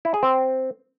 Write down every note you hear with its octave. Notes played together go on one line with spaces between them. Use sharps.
E4
G#4
C4